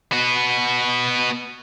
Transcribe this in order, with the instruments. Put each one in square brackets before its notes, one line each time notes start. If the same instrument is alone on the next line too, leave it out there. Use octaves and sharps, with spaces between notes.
[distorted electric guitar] B3 F#4